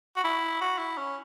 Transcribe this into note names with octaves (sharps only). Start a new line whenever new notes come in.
F#4
E4
F#4
E4
C#4